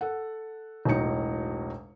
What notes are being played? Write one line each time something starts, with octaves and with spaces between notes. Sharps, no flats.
A4 F#5
E1 B1 A2 D#4 C#7